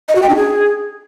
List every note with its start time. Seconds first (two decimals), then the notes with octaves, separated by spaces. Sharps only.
0.08 D#5
0.15 F#4
0.22 G5
0.29 D4
0.36 G#4